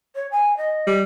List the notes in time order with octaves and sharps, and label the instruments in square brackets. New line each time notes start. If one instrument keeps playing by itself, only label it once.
[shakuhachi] C#5
G#5
D#5
[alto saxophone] G3